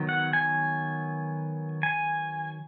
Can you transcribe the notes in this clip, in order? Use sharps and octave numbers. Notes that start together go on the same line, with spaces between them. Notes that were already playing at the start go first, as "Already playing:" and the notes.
Already playing: D#3 F#3 B3
F#5
G#5
G#5